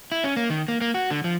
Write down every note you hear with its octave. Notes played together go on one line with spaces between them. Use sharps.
E4
C#4
A#3
D#3
A#3
A#3
F#4
D3
F3